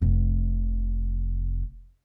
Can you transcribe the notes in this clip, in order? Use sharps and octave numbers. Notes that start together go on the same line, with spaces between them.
F1 C3